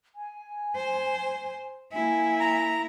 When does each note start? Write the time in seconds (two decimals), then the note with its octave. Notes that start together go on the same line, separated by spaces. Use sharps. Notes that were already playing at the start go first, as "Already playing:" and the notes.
0.15 G#5
0.76 C5
1.93 A#3 E4 G#5
2.40 A#5